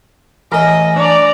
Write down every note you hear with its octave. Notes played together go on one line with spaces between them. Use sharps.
A1 A#4 D#5 E5 G#5
D4 D5 A#5